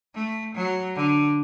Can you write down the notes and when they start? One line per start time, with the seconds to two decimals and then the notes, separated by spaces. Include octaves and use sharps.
0.15 A3
0.55 F#3
0.96 D3